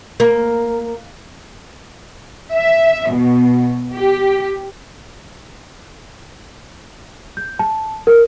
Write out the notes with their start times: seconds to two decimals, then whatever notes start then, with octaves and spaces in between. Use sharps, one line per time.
0.20 A#3
2.53 E5
3.10 B2
3.93 G4
7.37 G6
7.59 A5
8.07 A#4